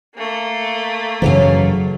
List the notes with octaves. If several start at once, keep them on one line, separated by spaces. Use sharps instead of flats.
A3 A#3
F#2 C#3 E3 F#3 C#5 F5